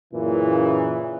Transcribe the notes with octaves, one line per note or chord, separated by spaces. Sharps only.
F#2 A#2 C#3 E3